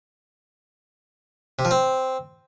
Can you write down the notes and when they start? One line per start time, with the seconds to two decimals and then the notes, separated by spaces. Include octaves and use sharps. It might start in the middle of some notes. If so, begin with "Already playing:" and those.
1.59 C3
1.65 F3
1.71 C4